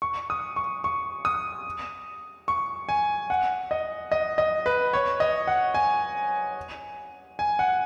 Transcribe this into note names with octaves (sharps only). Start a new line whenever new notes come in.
C#6
D#6
C#6
C#6
D#6
C#6
G#5
F#5
D#5
D#5
D#5
B4
C#5
D#5
F#5
G#5
G#5
F#5